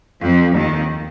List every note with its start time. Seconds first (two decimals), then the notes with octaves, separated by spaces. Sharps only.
0.24 F2 F3
0.56 D#2 D#3